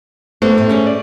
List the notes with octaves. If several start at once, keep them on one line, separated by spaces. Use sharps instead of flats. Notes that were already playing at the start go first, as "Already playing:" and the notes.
A3 B3 D4 C5
A2
C#4 G#4
D5